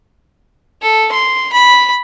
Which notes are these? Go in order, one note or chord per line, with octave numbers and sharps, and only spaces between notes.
A4
C6
B5